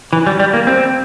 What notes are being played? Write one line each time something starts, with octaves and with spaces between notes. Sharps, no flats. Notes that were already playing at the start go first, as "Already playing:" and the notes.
E3
G3
G3
A#3
C4